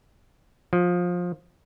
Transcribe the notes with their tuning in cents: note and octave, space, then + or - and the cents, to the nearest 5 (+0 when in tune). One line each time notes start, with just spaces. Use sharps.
F3 +20